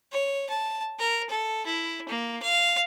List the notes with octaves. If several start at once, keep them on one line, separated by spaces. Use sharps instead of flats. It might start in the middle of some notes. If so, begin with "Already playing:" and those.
C#5
A5
A#4
A4
E4
A#3
F5